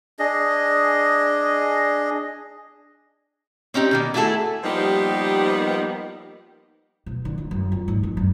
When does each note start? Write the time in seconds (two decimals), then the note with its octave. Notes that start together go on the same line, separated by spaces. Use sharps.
0.19 D4 G#4 D#5
3.74 C4 C#4 D#4 G4
3.91 B2 D#3 A#3
4.14 A3 E4 F#4 G#4 A4
4.64 F3 G3 A#3 B3 D#4 G4
7.06 B2
7.25 D3
7.38 F2
7.51 F#2
7.72 F4
7.88 G#2
8.03 F2
8.17 F#2